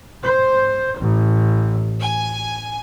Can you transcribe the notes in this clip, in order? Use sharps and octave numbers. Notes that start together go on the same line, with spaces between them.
C5
A1
G#5